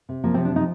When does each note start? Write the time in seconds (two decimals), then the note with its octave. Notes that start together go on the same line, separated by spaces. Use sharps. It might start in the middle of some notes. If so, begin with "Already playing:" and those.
0.09 C3
0.24 F3 A#3
0.34 C3 C4
0.45 D4
0.52 F3 D#4